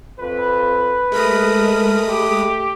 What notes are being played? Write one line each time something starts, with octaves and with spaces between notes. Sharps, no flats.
F2 B4
G#3 A3 A#4 B5 D#6
G4